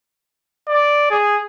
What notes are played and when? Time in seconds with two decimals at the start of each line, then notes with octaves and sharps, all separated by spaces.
0.68 D5
1.10 G#4